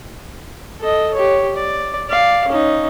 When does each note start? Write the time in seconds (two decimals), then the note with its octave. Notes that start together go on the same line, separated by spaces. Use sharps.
0.80 A4 D#5
1.14 G4 C#5
1.56 D5
2.09 D5 F5
2.48 C#4 D#4